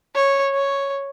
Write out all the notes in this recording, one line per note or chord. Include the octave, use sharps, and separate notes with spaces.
C#5
C#5